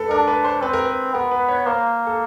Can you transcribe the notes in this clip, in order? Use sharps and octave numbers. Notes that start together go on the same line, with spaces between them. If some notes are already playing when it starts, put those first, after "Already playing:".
Already playing: A4 B4
D4 A#4
B4
C5
C4 B4
A#4
B4
B3 A#4
B4
C#5
A#3 C5
A4